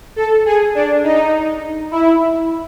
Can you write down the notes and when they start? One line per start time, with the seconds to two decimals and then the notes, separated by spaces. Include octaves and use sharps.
0.16 A4
0.46 G#4
0.75 D4
1.04 D#4
1.91 E4